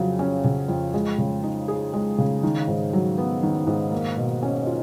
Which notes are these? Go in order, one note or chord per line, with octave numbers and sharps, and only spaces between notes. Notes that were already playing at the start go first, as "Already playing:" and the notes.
Already playing: F2 C#3 F#3
C#4
C#3
F2
G#3
C#3
D#4
G#4
G#3
C#3
D#3
G#2
F#3
B3
D#3
G#2
A#3
B2
C#4
F4